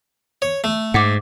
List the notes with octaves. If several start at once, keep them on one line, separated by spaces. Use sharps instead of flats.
C#5
A3
G#2 F#5 D6